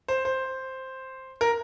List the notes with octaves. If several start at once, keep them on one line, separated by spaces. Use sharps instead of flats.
C5
C5
A#4